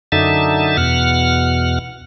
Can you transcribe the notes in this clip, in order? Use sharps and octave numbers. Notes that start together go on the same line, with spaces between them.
F#2 D3 D#4 E5 A5
E2 B2 F#5 F6